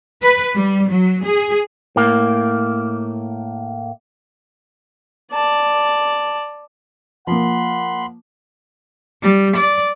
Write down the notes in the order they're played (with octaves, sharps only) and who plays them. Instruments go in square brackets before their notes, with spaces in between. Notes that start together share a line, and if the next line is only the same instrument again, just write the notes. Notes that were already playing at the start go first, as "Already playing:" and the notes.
[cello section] B4
G3
F#3
G#4
[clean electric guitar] A2 A#3
[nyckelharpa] D5 A5
[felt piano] F3 A#3 [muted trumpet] F#5 [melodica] B5 C6
[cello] G3
D5